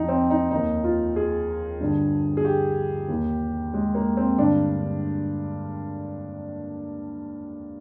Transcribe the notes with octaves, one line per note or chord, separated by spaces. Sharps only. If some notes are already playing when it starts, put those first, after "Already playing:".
Already playing: F2 D#3 D#4
C4
D#4
D#2 D#3 D#4
F4
G#4
G2 D3
G#4
G4
D#2 D#3
G#3
A#3
C4
G2 D3 D4